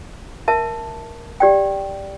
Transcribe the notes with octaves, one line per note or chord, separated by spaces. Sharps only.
A#4 E5 A5
G4 D5 G5